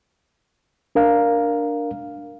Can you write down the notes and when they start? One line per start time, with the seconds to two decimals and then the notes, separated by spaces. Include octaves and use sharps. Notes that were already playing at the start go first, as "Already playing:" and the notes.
0.95 D4 A#4 F5